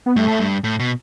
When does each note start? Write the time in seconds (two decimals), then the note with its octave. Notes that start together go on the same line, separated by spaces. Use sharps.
0.06 B3
0.16 G2 A3
0.28 A2
0.40 G2
0.64 A2
0.80 B2